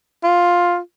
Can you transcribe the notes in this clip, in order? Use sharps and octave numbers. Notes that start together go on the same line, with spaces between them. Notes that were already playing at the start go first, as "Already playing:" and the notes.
F4